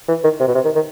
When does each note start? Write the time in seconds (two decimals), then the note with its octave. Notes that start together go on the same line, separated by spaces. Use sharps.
0.09 E3
0.24 D#3
0.40 C3
0.48 B2
0.55 C3
0.65 D#3
0.76 D#3